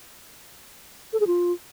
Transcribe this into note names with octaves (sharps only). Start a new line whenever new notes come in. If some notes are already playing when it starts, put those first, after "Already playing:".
A4
G#4
F4